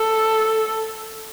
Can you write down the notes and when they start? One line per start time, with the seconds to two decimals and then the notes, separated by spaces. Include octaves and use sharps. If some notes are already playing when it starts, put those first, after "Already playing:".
Already playing: A4